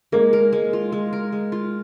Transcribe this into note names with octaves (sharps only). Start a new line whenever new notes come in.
G#3 A#3
A#4
G#3
F4
G#3
A#4
G#3
F4